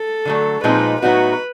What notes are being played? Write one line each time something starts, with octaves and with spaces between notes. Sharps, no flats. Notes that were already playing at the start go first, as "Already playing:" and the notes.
Already playing: A4
D3 F#3 A3
A#2 F3 G#3 C4 D#4 B4
A2 F#3 B3 D#4 F#4 B4